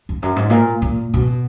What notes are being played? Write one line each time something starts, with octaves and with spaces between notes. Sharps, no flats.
F2
F#2
G#2
A#2
A#2
B2